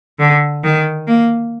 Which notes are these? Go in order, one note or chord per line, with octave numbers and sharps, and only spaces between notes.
D3
D#3
A#3